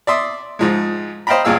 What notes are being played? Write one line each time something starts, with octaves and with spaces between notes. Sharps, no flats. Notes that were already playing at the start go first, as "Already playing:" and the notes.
D5 E5 C6 D#6
G#2 F3 G#3
C5 D#5 F5 G5 A#5 B5
C#2 G2 A#2 G#4 F5 E6